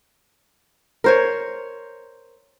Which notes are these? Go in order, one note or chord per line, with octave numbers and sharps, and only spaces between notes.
A#4 C5 C#5